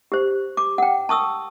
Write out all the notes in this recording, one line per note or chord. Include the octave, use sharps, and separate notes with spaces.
G4 C5
D6
F#5 G5
A5 C#6 D#6 E6